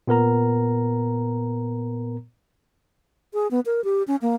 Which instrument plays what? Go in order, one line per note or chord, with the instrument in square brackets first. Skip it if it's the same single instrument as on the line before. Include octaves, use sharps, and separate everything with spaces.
[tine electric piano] A#2 B3 A#4 A#5
[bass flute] G#4
B3
A#4
G4
C#4
A#3